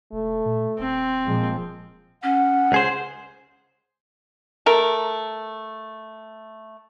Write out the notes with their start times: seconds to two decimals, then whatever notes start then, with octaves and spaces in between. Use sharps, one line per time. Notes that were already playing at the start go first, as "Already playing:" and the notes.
0.12 E1 A3
0.46 A#2
0.79 D#1 C4
1.26 A#2 F3 G#3
2.23 C#4 F#5
2.72 C#2 G#4 C5
4.66 A3 A#4